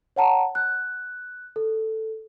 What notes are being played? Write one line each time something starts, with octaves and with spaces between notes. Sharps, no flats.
C#5 F#5 A5 A#5
F#6
A4